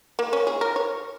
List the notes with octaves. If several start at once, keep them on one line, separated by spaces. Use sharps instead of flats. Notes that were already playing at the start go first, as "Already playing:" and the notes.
A#3
C#4
G#4
A#4
C#5